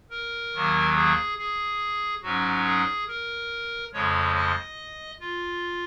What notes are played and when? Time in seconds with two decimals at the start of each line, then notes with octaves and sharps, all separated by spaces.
0.10 A#4
0.53 D#2 D#3 F#3 A#3
0.95 G#4
1.38 G#4
2.22 G#2 F#3 C#4 F#4
2.66 G#4
3.08 A#4
3.93 F2 C#3 F3 G#3 C#5
4.35 D#5
5.20 F4